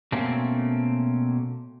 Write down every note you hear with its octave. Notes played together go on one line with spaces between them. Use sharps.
B2 A3 A#3 C4 C#4